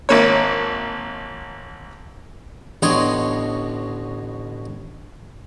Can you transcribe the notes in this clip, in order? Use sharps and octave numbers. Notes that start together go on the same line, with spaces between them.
G#1 A#3 C#5
A1 B2 D3 C#5 D#5 C6